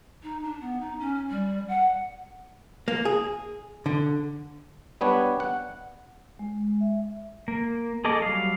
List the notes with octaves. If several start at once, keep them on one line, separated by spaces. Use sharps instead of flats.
D#4
D4
B3
D#4
C#4
G3
F#5
A#3
G#4
D3
G3 B3 D4 B4 C#5
F#5
G#3
E5
A#3
G#4 A4 D#5 D6
F#3 G3 F5